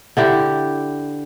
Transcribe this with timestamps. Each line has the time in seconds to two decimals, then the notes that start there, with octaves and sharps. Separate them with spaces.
0.17 D3 E4 G4